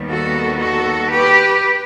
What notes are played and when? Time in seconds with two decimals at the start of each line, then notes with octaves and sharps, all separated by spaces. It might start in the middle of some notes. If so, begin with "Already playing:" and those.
Already playing: D#2 D#3 G3 B3
0.10 F#4 A4
0.61 F#4 A4
1.11 G4 B4